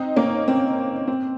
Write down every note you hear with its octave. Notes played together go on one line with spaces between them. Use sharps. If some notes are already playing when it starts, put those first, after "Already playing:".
Already playing: C4 D#4
A#3 C#4
C4
C4